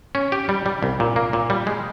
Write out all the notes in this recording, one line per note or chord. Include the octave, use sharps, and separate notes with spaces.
C#4
G4
G3
G3
C2
A#2
A#3
A#2
G3
G#3